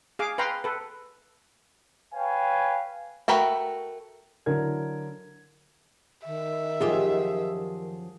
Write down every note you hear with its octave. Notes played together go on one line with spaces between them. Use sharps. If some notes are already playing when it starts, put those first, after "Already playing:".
G#4 F5 D6
B4 F5 G5 A#5 C6
A4 B4
B4 C#5 F5 G5 G#5
A3 F#4 A#4 B4 G5
D3 F#3 E4 A#4 G#6
D#3 E5
F#2 F3 F4 G4 G#4